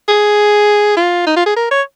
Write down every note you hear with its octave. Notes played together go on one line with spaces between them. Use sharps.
G#4
F4
D#4
F4
G#4
A#4
C#5